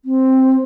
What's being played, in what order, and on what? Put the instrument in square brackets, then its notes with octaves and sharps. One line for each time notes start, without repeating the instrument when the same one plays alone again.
[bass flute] C4